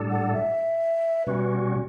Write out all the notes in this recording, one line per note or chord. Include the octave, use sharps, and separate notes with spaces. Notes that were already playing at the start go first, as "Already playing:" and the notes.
Already playing: A2 G3 D4 A4
F#5
E5
B2 G3 C#4 F#4 B4